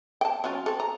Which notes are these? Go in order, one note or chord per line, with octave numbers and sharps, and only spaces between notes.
G5 A5
F#3 C#4 F4
C4 A4
A#5